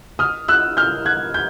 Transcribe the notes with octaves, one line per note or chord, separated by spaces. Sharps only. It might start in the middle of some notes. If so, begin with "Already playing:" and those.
D#6 F6
E6 F#6
F6 G6
F#6 G#6
G6